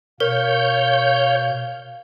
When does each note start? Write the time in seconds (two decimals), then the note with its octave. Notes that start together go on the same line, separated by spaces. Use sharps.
0.20 B2 A#4 C#5 F5 G6